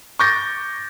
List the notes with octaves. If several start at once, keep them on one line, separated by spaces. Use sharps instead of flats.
C#6 D6 G6 A6 A#6